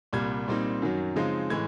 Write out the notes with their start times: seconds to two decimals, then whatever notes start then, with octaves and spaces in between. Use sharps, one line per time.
0.13 C2 A#2 G3 G#6
0.48 A#2 G3 C4 D#4
0.82 F#2 D#3 F#3
1.16 C#3 F3 G#3 C4 D#4
1.50 A2 E3 G#3 G#6